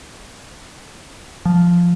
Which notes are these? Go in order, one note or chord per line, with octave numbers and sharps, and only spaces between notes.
F3